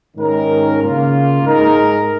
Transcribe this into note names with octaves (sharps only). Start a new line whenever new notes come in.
G#2 D#3 C#4 A#4
C#3 A#3 F4
G#2 G#3 D#4 A#4